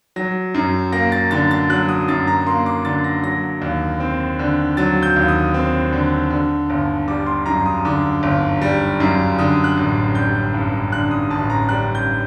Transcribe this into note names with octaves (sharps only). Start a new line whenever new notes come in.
F#3 A#6
F#2
A#3 A#6
A6
D3 A6
A6
F#3 F#6
D#6
F#2 A6
A#5
A#3 C6
D6
D3 A6
A#6
F#3 A#6
D#2
C4
D3
F#3 A6
G6
D#2
D#6
C4
D3
D3
G1
G3 D6
C6
F#2 A#5
D#6
D3 D6
G1
G3
F#2
D3 D#6
F#6
A1
G3 G6
G2
D3 F#6
D#6
A1 A5
A#5
G3 F#6
G6